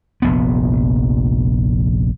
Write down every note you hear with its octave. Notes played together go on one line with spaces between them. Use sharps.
F1 A#1 B3